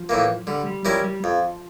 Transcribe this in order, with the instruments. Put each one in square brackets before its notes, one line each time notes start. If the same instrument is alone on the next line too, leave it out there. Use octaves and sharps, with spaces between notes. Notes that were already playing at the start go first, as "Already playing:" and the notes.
Already playing: [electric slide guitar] F3
[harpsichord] A2 E3 A#3
[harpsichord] D3 [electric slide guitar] G3
[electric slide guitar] G3
[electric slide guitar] F3 [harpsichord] G3 C#4 E4 A#4
[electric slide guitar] G3
[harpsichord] F2 [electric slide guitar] F3